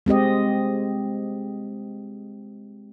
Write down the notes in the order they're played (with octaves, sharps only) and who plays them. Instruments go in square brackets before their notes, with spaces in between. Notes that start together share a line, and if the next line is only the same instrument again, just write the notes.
[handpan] G#3 C4 G4 D#5